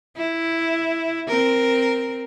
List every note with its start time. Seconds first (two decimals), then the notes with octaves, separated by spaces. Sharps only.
0.17 E4
1.27 C4 A#4